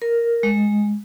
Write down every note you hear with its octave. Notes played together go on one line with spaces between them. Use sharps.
A#4
G#3